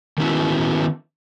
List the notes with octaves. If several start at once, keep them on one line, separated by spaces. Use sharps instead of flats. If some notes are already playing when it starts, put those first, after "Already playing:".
D#3 F#3 B3 C#4 E4 F#4